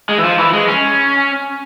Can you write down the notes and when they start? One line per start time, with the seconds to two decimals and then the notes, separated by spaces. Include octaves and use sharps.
0.09 G#3
0.18 E3
0.24 F3
0.39 E3
0.54 G#3
0.68 C#4